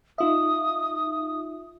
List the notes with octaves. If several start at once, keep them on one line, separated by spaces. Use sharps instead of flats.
D#4 F4 E5 D#6